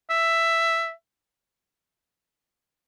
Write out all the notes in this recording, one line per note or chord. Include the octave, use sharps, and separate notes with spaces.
E5